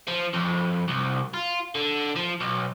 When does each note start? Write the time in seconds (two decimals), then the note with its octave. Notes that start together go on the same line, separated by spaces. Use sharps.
0.08 F3
0.33 F2
0.88 C2
1.34 F4
1.75 D3
2.16 F3
2.40 B1